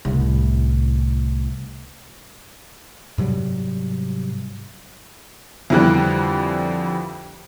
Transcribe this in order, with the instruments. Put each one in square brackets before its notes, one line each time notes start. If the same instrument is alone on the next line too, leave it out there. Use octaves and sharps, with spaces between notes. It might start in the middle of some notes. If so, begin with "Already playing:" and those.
[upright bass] C2 A2
[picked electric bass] G#2 C3 F#3 G3
[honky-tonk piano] F2 D3 E3 G3 G4 F#6